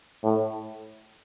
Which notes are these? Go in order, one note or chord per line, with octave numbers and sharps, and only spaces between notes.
A2